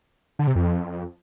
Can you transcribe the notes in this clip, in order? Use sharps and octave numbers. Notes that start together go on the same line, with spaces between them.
D3
C3
F2